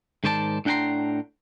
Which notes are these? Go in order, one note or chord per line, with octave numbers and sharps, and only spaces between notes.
G#2 D#3 C5 D5 A5
A2 D4 F#5 G5 A#5 C6